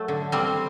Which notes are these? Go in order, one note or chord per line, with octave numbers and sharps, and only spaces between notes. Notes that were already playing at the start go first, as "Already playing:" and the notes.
Already playing: F#3 A3
D3
G3 C4